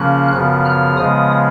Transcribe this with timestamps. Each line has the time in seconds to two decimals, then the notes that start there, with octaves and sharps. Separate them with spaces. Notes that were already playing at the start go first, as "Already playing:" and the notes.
Already playing: C#3 F3 A#3 C#4 F#6
0.32 F#2 C#3 F3 B3 F#6
0.65 F6
0.97 C#3 F3 G#3 B3 D#6